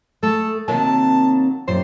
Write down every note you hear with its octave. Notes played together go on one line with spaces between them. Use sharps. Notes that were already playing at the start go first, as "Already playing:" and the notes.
A3 G#4 A4
C3 D#3 F#3 A#3 A5
F#2 A#2 G4 C5